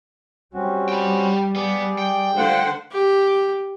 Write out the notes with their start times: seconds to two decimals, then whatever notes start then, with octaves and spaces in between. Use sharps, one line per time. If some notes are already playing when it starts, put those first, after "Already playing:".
0.54 G3 C4 C#4 F#4
0.89 G5 B5
1.56 B3 G#4 D5
1.98 G5
2.36 D3 F4 C5 F#5
2.92 G4